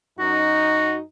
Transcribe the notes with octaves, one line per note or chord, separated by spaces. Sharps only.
F#2 D#4 F#4